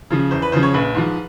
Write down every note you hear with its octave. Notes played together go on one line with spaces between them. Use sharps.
C#3 F3
E2 C5
B4
C#3 F3 C5
C#5
A#1 B4
G#2 F3